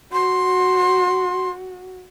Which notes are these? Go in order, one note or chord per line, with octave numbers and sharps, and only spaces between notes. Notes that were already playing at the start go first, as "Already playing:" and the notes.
F#4 C6